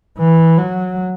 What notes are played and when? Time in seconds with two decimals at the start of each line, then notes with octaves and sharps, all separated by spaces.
0.18 E3
0.58 F#3